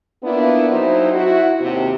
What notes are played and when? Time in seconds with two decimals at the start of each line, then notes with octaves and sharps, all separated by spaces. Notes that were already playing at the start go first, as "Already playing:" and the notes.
0.23 A#3 B3 D4 E4 F4 B4
0.70 F2 F#3 D#4 E4 C5
1.14 E4 F#4
1.61 D#2 C3